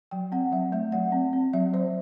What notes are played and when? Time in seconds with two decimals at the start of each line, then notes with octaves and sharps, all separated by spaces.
0.11 F#3 G5
0.32 C4 F#5
0.52 F#3 E5
0.72 A3 E5
0.92 F#3 F#5
1.12 C4
1.33 C4
1.53 F#3 E5
1.73 F#3 C5